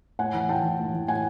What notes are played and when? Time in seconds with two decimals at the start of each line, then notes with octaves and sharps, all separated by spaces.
0.19 A2 F#5 G#5
0.34 E3
0.49 A2 G5 A5
0.64 E3
0.80 A2
0.94 E3
1.08 A2 F#5 G#5